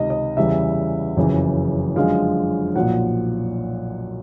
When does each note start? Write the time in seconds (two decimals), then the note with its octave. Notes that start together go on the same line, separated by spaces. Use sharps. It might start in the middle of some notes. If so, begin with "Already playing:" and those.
Already playing: C#2 C3 D#3 D#5
0.10 D#5
0.37 E2 C#3 E3 G3 E5
1.16 F#1 F2 C#3 E3
1.96 F#2 D3 F3 G#3 F5
2.75 B1 A#2 F3 F#5